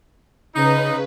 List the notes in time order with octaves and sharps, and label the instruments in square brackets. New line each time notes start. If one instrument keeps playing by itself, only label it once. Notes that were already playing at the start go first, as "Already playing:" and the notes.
[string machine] C#3 B4 [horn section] D#4